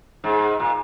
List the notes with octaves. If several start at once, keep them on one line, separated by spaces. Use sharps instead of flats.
G#2
A#2